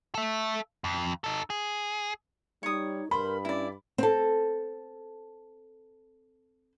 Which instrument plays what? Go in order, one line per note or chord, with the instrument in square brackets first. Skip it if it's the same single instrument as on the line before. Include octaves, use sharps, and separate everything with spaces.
[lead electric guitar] A4 E5
F2
D#4 A4
G#4
[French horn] G3 [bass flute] D#4 [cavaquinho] C#5 D#6
[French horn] G2 [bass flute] A#4 [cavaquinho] C5 [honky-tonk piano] B5
[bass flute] C#4 [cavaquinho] E4 D5
[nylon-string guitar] C4 A4